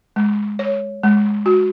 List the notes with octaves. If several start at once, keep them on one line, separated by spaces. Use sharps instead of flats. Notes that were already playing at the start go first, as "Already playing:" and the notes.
G#3
C#5
G#3
F#4